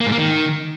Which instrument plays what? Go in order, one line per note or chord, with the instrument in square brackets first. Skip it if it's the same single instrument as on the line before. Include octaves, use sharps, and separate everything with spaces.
[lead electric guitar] A#3
G#2
A#3
D#3